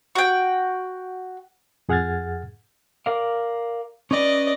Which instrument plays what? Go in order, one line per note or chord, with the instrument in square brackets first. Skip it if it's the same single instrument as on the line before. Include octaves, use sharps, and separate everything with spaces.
[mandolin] F#4 G5
[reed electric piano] F2 G#4 F#5 F6 G#6 A6
[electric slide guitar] A#4 D5 F5
[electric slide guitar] C#4 B4 [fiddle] D5 D#5